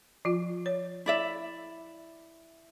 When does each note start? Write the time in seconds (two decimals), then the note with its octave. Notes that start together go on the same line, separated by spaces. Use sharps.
0.25 F3 F4
0.66 C#5
1.06 E4 D5 E5